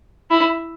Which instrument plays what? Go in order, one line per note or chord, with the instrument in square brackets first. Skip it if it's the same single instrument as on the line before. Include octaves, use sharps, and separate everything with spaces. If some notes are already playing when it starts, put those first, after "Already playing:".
[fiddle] E4